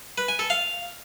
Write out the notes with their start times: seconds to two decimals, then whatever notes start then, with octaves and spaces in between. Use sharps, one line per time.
0.18 B4
0.28 G#5
0.39 A4
0.50 F5